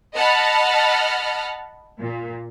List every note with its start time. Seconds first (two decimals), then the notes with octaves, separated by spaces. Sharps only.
0.16 D#5 F#5 A5 B5 F6
2.01 A#2